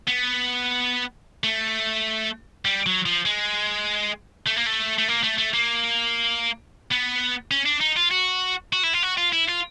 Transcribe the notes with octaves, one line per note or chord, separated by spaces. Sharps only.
B3
A3
G3
F#3
F3
G#3
A3
A#3
A3
A3
A#3
A3
A3
A#3
B3
C#4
D4
D#4
F4
F#4
F#4
E4
F4
F#4
F4
E4
F4